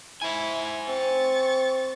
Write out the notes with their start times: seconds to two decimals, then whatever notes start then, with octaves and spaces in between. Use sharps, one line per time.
0.22 E4 C5 G#5
0.88 C4 C#6 A6